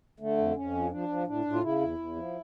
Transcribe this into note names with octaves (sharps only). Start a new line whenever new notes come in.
D3 A3
F2
F2 C#4
F3
F3 D4
F3
A2 D4
A2
F4
C#3 E4
E2
E2
F3